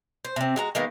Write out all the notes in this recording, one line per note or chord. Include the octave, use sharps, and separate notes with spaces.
C5
C3 C4
G#3 F#4 A#5
D#3 G#3 A#3 B3